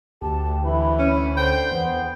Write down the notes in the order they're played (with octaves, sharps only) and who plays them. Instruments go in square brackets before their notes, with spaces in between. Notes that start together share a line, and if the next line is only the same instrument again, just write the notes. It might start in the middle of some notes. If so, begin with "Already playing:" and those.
[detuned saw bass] D2 [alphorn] G4 [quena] A5
[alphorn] E3 [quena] B5
[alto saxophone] C#4
[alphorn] D3 [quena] C5 [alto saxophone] G5
[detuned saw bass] E2 [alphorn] B3